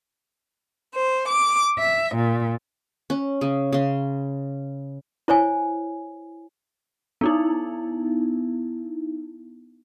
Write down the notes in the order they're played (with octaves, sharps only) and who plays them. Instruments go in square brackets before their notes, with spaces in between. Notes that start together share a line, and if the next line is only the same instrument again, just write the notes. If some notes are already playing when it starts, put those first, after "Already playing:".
[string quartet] C5
D6
E5
A#2
[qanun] C#4
C#3
C#3 C6
[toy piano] E4 C5 C#5 G#5
[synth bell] B3 D#4 E4